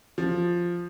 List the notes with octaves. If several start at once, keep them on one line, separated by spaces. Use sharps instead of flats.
F3